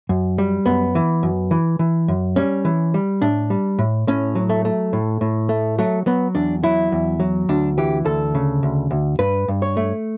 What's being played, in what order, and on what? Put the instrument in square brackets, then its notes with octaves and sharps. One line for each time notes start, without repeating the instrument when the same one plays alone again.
[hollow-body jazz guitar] F#2
G3
F#2 B3
E3
F#2
E3
E3
F#2
G3 C#4
E3
G3
A2 D4
G3
A2
A2 C#4
F#3
A3
A3
A2
A2
A3
F#3 A3
F#3 B3
E2 D4
F#3 E4
E2
F#3
D2 D4
E3 G4
D2 A4
C#3
D2
D2
G2 B4
G2
C#5
A3